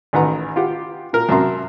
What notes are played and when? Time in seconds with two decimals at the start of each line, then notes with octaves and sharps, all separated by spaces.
0.13 A1 D#3 B4 F#5 A#5
0.56 F4 G4 F#5
1.13 A#2 A#4
1.29 F#2 C3 E5 A5 A#5 C6